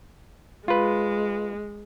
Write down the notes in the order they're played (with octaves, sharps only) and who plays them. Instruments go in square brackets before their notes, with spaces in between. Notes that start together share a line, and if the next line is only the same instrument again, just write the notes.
[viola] G#3 [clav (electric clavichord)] F4 B4